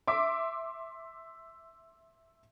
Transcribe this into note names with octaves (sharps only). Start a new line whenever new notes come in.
E5 C6 D6